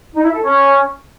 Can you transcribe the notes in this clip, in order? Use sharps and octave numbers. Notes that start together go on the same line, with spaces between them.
D#4
E4
A4
C#4